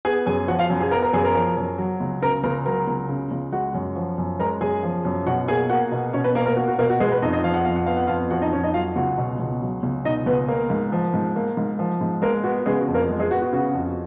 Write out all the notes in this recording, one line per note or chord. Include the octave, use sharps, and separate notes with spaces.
B3 G#4 G#5
F#2 G#4 G#5
F3 F#4 F#5
F4 F5
F#2
G#4 G#5
B3 A#4 A#5
A#4 A#5
F#2 G#4 G#5
A#4 A#5
F3
F#2
F#3
C#2
C#3 A#4 A#5
C#2 A#4 A#5
F#3 A#4 A#5
C#2
C#3
C#2
G#3 F#4 F#5
F#2
F3
F#2
G#3 A#4 A#5
F#2 G#4 G#5
F3
F#2
B2 F#4 F#5
A#3 G#4 G#5
A#3 F#4 F#5
B2
B2 C#4 C#5
B3 B4
A#3 A#4
A#3 A#4
A#3 F#4
F#4
B2 A#3 A#4
F#4
G#3 B3 G#4
B3 B4
F2 D#4 D#5
D#4 D#5
F3 F5
F#5
F2 F5
F#5
B3 F5
F#5
F2 F4 F5
F3 F#4 F#5
D#4 D#5
F2 C#4 C#5
D#4 D#5
F#3 F4 F5
C#2 F#4 F#5
B2
C#2
F#3
C#2
B2 D#4 D#5
C#2 B3 B4
A#3 A#4
G#2
F3
G#2
A#3
G#2
F3
G#2
G#3 A#3 A#4
B3 F#4
C#3 G#3 G#4
F#4
F2
A#3 A#4
G#3
G#3 G#4
B3 F#4
F#4
C#3 F#4
F2